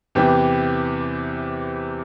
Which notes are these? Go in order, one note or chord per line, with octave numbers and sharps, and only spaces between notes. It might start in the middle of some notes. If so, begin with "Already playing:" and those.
E2 C3 E3 G4